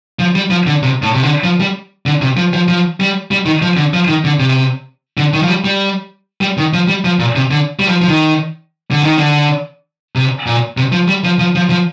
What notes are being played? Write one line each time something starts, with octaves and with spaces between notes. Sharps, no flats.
F3
G3
F3
D3
C3
A2
C3
D3
F3
G3
D3
C3
F3
F3
F3
G3
G3
D#3
F3
D3
F3
D#3
D3
C3
D3
D#3
F3
G3
G3
G3
D#3
F3
G3
F3
A#2
C3
D3
G3
F3
F3
D#3
D3
D#3
D3
C3
A#2
C3
F3
G3
F3
F3
F3
F3